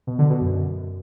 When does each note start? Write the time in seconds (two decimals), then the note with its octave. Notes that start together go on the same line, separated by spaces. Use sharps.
0.07 B2
0.19 D3
0.30 B2
0.41 F#2